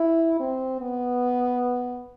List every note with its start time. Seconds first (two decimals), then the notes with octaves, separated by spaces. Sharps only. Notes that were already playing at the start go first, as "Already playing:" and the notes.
Already playing: E4
0.40 C4
0.81 B3